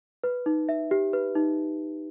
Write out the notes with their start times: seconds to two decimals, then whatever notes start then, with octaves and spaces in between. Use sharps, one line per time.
0.24 B4
0.46 D#4
0.69 E5
0.91 G4
1.13 B4
1.35 D#4